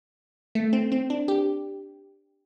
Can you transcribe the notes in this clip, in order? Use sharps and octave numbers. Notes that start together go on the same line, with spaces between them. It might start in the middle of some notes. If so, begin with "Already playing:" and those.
A3
C4
C4
D4
G4